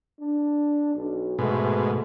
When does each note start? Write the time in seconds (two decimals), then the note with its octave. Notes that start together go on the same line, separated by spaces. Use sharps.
0.19 D4
0.94 B1
1.39 G#2 B2 A3